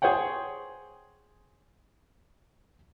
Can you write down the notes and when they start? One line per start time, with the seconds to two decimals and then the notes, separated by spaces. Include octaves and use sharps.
0.02 G#4 C5 C#5 F#5 G5